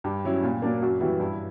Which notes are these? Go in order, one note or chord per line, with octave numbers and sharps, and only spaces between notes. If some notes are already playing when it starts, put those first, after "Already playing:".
G2 G4
F#3 C#4 E4
A#2
F#3 A#3 D4
F#2 F#4
E3 G3 B3 E4 F#4
G2 E4